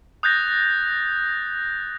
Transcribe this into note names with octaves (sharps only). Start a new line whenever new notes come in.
D#6 F#6 G6 A6 A#6